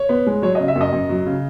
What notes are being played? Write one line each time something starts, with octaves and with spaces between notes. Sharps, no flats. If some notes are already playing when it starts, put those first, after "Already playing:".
Already playing: C#5
B3
G#3
F#3 C#5
C#3 D#5
E5
F#2
D#5
F#2
F#3
C#3